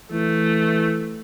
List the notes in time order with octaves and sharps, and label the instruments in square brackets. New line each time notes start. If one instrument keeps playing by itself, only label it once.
[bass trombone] E3 [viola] A3